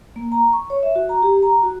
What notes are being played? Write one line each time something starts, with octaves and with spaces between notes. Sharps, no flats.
A#3
A#5
C#6
C#5
E5
F#4
A#5
G4
A#5
F#4